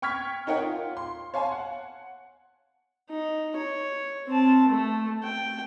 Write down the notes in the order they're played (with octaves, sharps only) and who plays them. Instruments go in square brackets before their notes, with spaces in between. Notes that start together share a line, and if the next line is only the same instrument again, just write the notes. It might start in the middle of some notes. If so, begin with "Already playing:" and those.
[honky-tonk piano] G5 C#6 F6 G#6 B6
D#4 A#4 C#5 F#5 G5
F4
C6
C#5 F5 G#5 A5 C6
F#5
[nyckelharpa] D#4
C#5
C4 A5
A3
G5